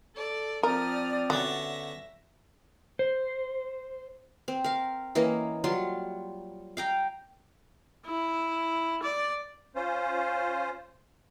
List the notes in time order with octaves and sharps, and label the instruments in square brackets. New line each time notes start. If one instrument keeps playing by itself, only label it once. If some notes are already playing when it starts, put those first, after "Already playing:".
[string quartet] A4 D5
[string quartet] F3 D#6 F6 [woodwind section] C4 D5 [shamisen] A#4
[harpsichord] D3 B3 C#4 [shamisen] F#4 [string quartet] E5 A#6
[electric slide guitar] C5
[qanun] C4
A#4 F5
E3 A#3 C#4 D#5
F#3 G3 F4 C6
F5 G5 A#5
[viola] E4
D5
[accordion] C#4 F4 C5